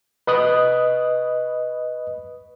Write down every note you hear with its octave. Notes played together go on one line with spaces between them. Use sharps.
B4 D#5 D#6 F#6